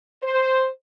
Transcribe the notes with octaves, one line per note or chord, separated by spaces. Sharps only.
C5